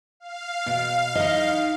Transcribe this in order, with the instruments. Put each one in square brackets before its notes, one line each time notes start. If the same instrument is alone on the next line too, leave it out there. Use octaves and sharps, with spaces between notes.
[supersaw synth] F5
[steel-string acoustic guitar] B2
D#4 E4 D#5